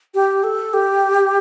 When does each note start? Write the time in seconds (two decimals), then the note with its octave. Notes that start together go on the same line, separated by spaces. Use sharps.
0.15 G4
0.44 A4
0.74 G4